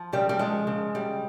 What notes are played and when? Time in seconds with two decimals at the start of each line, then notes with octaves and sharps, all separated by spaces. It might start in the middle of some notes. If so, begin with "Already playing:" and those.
Already playing: F3
0.13 C#3 G3
0.29 G3
0.39 F3 G#3
0.67 C#3
0.95 G3